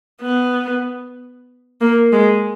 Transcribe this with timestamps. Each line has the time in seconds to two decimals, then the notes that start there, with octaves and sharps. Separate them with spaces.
0.21 B3
1.81 A#3
2.13 G#3